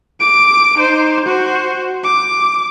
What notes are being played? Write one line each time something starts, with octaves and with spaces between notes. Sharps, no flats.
D6 D7
D#4 C5
F#4 C5
D6